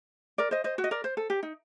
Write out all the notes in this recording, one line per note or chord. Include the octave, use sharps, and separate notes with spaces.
A#4 D5
C5 D#5
C5 D#5
F#4
D#5
A#4 D5
C5
A4
G4
D#4